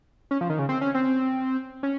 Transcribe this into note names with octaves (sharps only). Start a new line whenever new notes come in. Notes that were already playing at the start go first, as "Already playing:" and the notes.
C#4
F3
D#3
C#3
C4
C#4
C4
C#4